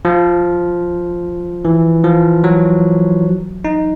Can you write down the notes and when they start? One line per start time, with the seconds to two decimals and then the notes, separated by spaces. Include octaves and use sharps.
0.05 F3
1.65 E3
2.04 F3
2.44 F#3
3.65 D#4